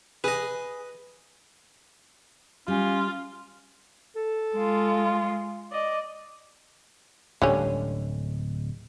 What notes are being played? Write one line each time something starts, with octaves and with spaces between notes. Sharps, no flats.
G#4 B4 D#5
G3 C#4 F4
A4
G#3 F4
D5 D#5
D1 D3 G3 G#3 C#4